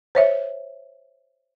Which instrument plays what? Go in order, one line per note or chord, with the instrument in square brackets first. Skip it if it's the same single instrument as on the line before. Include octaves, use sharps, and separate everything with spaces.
[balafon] C5 C#5 E5